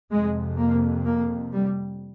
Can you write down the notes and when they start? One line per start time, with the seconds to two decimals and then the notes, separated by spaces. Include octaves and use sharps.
0.11 F2 C3 G#3
0.58 A#3
1.05 A#3
1.51 G3